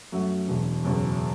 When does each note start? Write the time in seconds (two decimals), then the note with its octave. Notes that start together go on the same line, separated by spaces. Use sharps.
0.12 F#2 F#3 A3 F#4
0.47 E1 E2 B2
0.83 F#1 E2 B2 F#3